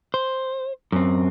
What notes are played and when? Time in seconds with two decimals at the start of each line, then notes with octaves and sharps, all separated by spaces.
0.14 C5
0.92 F#2 C4